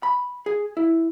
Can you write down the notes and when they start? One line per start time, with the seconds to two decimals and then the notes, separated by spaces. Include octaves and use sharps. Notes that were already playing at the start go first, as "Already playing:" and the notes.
0.03 B5
0.46 G#4
0.77 E4